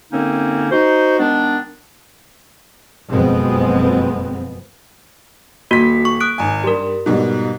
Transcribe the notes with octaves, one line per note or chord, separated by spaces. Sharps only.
F#2 D3 A#3 C4 C#4 D#4
D#4 F#4 C5
D#3 G#3 B3 D4
F#1 F2 B2 G#3 B3 C4
D#1 A#3 F#4 B6
C#6
D#6 F#6 D7
G#1 G#5
G2 G3 G4 A#4
G#2 B2 G3